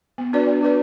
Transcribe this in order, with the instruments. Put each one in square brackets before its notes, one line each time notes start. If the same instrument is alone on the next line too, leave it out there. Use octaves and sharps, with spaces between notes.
[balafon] B3
D4 F#4 B4 D5
B3
D4 F#4 B4 D5